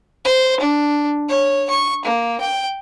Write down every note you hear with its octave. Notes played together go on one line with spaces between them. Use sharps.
C5
D4
C#5
C#6
A#3
G5